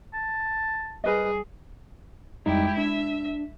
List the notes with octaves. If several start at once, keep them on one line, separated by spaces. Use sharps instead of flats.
A5
G3 G#4 A#4 B4 D#5
F2 G3 G#3 D#4 E4 G4
D4 E5